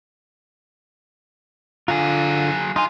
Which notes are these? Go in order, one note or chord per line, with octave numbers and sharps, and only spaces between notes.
D3 F#3 F4 G#4
D#4 F4 G#5